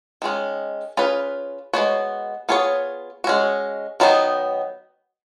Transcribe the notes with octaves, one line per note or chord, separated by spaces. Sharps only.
D#3 G#3 C#4
C#4 F4 G#4 B4
G#3 B3 F#4 C#5
B3 F4 G#4 C#5
G#3 C#4 F#4
D#3 F#3 B3 D#4